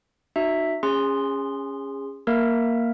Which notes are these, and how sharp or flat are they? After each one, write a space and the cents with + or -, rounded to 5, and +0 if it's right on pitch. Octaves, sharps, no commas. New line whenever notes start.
D#4 -35 F#4 +0 E5 +0
C#4 +0 G#4 -25 C6 +0
A#3 +0 A#4 +0 E5 +0